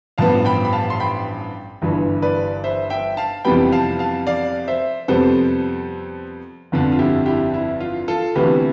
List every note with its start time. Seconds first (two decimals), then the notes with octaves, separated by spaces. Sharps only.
0.18 A1 G2 F3 B3 F5 A5
0.45 G5 B5
0.65 B5
0.73 F5 A5
0.90 C6
1.00 G5 B5
1.82 G1 G2 E3
2.22 B4 D5
2.64 C5 E5
2.90 E5 G5
3.17 F5 A5
3.45 F2 C3 E3 G3 B3 G5 B5
3.72 F5 A5
3.99 F5 A5
4.27 D5 F5
4.68 C5 E5
5.08 F2 C3 G3 B3 A4 C5
6.72 G1 F2 D3
6.92 F4
6.99 E4 G4
7.26 E4 G4
7.54 E4
7.80 F4
8.08 F4 A4
8.35 D2 C3 E3 B3 G4 B4